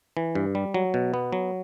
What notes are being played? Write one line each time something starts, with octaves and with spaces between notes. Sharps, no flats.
E3
G2
G3
F#3
B2
B3
F#3